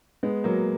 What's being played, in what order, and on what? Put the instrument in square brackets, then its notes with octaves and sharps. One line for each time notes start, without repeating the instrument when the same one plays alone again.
[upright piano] G#3 B3
F#3 A#3